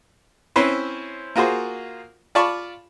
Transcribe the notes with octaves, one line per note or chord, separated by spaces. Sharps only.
C4 C#4 E4 B4 C5
A#3 F4 F#4 G#4 C5
F4 D5 A5 B5 C#6